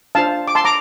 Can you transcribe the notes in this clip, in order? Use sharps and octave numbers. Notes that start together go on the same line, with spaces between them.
D4 F4 C5 F5 A5
D6
A5 C6
A#5 D6